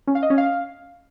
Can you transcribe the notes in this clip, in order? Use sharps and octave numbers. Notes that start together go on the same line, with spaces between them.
C#4
F5
D#5
C#4
F5